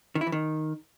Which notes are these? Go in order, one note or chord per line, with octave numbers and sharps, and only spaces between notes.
D#3
E4
E3
D#3